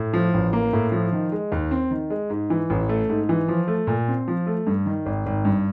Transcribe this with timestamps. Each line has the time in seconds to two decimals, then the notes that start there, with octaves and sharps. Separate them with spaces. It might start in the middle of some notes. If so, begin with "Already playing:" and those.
Already playing: A2
0.13 F3
0.34 A1
0.53 A#3
0.73 A2
0.92 F3
1.12 D#3
1.32 G#3
1.52 D#2
1.71 C4
1.91 D#3
2.10 G#3
2.30 G#2
2.50 E3
2.70 A1
2.89 A3
3.09 G#2
3.29 E3
3.48 F3
3.68 A3
3.87 A#2
4.08 C4
4.28 F3
4.47 A3
4.67 G2
4.86 D#3
5.06 G#1
5.26 G#1
5.45 G2